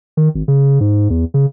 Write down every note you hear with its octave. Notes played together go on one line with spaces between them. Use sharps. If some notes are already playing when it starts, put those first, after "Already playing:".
D#3
G#1
C#3
G#2
E2
C#3